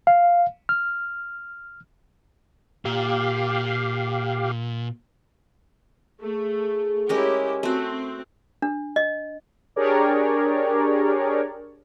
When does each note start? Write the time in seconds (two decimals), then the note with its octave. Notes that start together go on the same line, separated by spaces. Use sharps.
0.07 F5
0.69 F6
2.85 A#2 G4 F5
6.21 A3 G#4
7.09 G#3 C#4 E4 G4 A#4
7.63 A3 C4 F#4
8.62 D4
8.96 D#5
9.76 D4 G4 G#4 A#4 C#5 D5